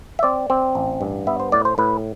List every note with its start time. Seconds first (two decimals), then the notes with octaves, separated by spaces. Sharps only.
0.19 E5
0.23 C4 D5
0.50 C4
0.75 A1
1.01 G2
1.27 B3 E5
1.40 C5
1.52 A2 D5
1.65 C5
1.78 A2 B4